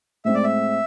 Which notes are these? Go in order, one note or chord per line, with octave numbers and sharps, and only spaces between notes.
A2 G#3 C4 E5
D5
E5